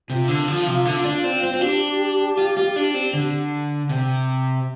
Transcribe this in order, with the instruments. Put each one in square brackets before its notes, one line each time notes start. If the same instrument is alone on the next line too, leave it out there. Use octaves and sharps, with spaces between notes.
[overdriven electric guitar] C3 [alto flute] F4
[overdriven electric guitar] D3
F3
C3
D3
D4
C4
C4
C4
[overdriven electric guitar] D4 [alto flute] G4
[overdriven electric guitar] F4
F4
D4
C4
D3
C3